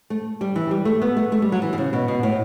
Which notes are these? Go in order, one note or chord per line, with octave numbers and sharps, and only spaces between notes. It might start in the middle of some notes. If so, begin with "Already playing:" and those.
A3
G3
E3
G3
A3
B3
A3
A3
G3
F#3
E3
B2
C#3
B2
B2
A2